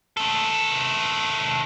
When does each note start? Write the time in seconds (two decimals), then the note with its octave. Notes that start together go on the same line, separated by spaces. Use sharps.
0.17 D#3 A4